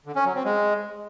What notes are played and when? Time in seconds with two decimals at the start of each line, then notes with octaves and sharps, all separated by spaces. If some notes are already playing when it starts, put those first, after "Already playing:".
0.06 D3
0.16 C#4
0.25 F#3
0.35 C4
0.45 G#3